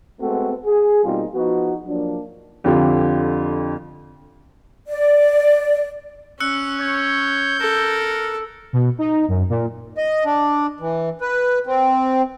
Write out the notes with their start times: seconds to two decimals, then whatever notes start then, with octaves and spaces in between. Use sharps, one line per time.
0.20 G#3 A3 B3 C4 F#4 A4
0.66 G#4
1.04 B2 G3 A#3 C4 D#4 F4
1.34 F3 B3 D#4 F#4
1.87 F3 F#3 A#3 D4
2.64 F2 D3 F4 G4
4.88 D5
6.40 C#4 E6 F#6 C#7
6.80 C#5 G6
7.60 A4 A#4
8.73 B2
8.99 D#4
9.28 F#2
9.49 A#2
9.97 D#5
10.25 D4
10.80 E3
11.21 B4
11.66 C4